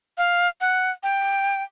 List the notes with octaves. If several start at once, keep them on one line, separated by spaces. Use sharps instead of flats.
F5
F#5
G5